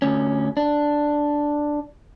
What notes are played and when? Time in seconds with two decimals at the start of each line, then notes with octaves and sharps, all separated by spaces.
0.02 D2 C#4
0.57 D4